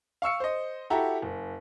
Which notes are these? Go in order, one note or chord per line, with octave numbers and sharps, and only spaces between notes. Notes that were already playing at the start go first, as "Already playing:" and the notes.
F5 C#6 E6 C#7
C5 D#5
E4 F#4 G4 A4 A#5
F#1